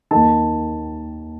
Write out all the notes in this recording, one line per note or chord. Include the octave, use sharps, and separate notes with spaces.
D#2 D#3 A5